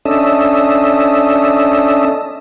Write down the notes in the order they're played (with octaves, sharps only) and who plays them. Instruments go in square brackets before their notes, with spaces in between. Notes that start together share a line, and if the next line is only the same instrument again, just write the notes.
[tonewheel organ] C#4 D4 A4 D#5 E5